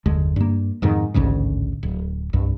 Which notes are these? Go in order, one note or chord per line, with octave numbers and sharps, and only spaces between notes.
F#1 D#2 D3 G#3
G2 A#3
F2 G#2 D#3
A1 D2 G#2 C#3
D1
C2 G2